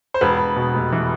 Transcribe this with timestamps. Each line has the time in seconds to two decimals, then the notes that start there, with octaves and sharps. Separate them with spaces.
0.14 C5
0.21 E1 B4
0.38 E1
0.56 B2
0.74 F1
0.92 E3